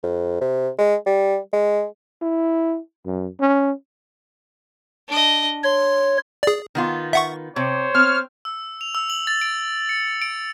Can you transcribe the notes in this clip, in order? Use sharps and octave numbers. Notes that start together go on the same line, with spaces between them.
F2
C3
G#3
G3
G#3
E4
F#2
C#4
D4 D#5
C#5 C6
G#4 D5
D#3 B3 F4
E5 F#5 C#6
C3 C5 C#5
C4 F6
E6
F7
E6
F#7
A6
D7
C#7
D7